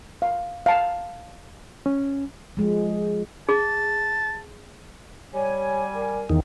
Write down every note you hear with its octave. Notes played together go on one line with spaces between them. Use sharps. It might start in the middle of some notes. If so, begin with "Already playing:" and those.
F5
F5 A5
C#4
F3 G#3
G#4 A5
G3 C#5 G#5
A#4
E2 D#3